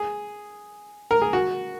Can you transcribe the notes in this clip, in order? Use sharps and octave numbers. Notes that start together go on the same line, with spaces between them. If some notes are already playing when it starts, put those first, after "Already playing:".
Already playing: G#4
A#4
G#4
F#4